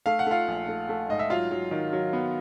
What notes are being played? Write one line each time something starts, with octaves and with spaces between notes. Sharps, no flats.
A3 F5
F#5
A3 F4 F5
A#1
A3
A3
G#2 D#5
E5
F#3 F4 F5
F#3
D#3
F#3
B3